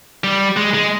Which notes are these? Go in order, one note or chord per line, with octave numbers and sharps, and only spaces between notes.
G3
G#3
G#3